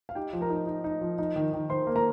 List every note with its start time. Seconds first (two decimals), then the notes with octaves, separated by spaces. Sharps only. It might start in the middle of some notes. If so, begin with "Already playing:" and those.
0.09 F5
0.15 D#4 G4 G5
0.33 F3
0.41 A#4 A#5
0.50 D#4
0.67 D#4
0.84 D#4
1.01 F3
1.19 D#4
1.36 D#3
1.53 D#3
1.70 D#3 C5 C6
1.87 A#3
1.96 A#4 A#5